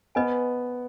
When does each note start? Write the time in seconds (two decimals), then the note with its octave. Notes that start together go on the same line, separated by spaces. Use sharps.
0.15 B3 B4 D#5 G#5